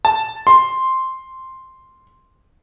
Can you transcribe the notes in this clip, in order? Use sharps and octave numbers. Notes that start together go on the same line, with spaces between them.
A5
C6